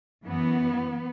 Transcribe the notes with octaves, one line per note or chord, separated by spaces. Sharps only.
F#2 E3 B3